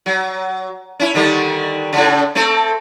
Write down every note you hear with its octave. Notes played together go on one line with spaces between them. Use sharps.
F#3
C#4 E4
D3 D#3 G3
A2 C#3
A3 C4 A4